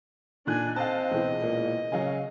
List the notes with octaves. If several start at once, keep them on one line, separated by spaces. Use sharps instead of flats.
A#2 D4 D#4 G#5 F#6
C4 D#5 F5 A5
C#2 B2 E3
A#2
C#3 F#3 F5 G#5